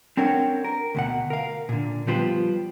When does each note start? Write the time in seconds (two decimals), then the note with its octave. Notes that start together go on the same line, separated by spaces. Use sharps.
0.17 C4 D4 A#4 C#5 F#5
0.64 A#4
0.95 D2 B2 F#5
1.30 A#4 F5
1.69 A#2 D3
2.07 F3 G3 B3 F4 C5